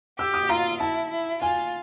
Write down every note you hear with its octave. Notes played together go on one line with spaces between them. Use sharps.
G4 E6
D#6
F4 A#5
E4 A5
E4
F4 G#5